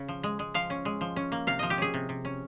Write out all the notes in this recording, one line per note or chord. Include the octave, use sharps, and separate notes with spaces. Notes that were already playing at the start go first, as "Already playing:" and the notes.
Already playing: C#3 C#4
F3
G#3
G#3
F3 F5
C#4
G#3
F3
C#4
A#3
C3 F5
F3 D#5
G4
C#4 G#4
C3
C3
C#4